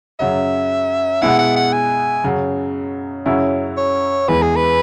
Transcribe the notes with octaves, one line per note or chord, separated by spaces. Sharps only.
F#2 C#3 F#3 E5
B2 G#3 B3 E4 F#5
F#5
F#5
G#5
F#2 C#3 F#3
F#2 C#3 F#3 C#4 E4
C#5
E2 E3 G#3 B4
G#4
B4